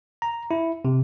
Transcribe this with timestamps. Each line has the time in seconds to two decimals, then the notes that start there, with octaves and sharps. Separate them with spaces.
0.22 A#5
0.51 E4
0.85 C3